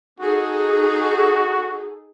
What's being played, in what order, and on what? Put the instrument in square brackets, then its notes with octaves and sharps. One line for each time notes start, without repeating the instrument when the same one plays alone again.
[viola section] D#4 G#4 A4 [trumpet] F#4